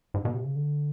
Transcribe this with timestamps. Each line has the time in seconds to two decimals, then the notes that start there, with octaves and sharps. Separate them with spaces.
0.14 G#2
0.25 B2
0.34 C3
0.44 C#3
0.56 D3